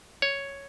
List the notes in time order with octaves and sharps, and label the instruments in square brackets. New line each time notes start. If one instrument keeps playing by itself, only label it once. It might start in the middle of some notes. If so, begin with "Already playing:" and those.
[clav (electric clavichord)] C#5